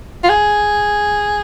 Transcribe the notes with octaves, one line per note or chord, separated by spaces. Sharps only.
F4
G#4